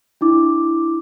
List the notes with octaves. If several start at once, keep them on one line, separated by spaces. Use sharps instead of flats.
D4 E4 D6